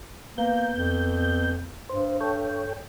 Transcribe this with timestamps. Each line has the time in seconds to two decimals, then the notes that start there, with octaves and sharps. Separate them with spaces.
0.38 A#3 B3 G6
0.76 F2
1.89 G2 C5
2.21 A4 C#5 G5